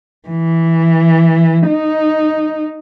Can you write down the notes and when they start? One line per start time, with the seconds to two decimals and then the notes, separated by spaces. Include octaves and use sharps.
0.29 E3
1.68 D#4